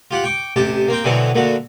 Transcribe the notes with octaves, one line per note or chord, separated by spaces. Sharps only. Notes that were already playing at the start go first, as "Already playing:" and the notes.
F4 G4 F#5
G5 C#6 D6
A1 C3 G4 A5
A#3 C4 G5
B2 D3 E3 F#3 A3 C4
A#2 D3 A3 F#4